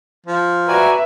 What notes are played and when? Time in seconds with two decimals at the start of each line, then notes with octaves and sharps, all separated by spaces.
0.26 F3
0.68 F#4 B4 D5 E5 G#5 A#5